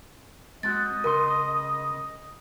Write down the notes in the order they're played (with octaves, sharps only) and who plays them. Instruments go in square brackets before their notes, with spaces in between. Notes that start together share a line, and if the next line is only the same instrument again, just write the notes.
[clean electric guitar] G#3 C4 F#4 [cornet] D#5 [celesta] A6
[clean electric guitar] C#2 C#3 C6 [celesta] A#4